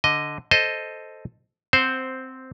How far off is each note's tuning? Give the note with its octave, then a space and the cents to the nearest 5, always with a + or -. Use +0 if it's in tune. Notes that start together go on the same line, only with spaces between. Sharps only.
D3 +0 D#5 +0
A4 +0 C5 +0 D#5 +0
C4 -5 C5 +0 F#5 +0